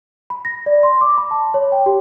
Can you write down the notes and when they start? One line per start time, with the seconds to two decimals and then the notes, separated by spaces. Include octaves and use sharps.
0.30 B5
0.45 A#6
0.66 D5
0.83 C6
1.01 D6
1.18 B5
1.31 A5
1.54 C#5
1.72 G5
1.86 G4